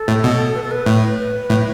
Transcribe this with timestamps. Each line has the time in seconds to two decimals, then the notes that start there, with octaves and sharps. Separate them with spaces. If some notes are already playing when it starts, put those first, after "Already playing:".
Already playing: A4
0.08 A2
0.24 B2
0.55 B4
0.63 A4
0.71 B4
0.86 A2
1.19 B4
1.50 A2